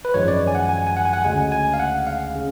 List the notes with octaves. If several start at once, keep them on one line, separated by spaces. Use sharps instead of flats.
B4
G#1 F#2 F3 G#3 C#5
D5
G#5
F#5
G#5
G#5
F#5
G#5
F#5
D2 C#3 G#3 G#5
G#5
F5
F#5
F5
C#3